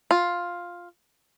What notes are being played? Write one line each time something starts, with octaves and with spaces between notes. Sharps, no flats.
F4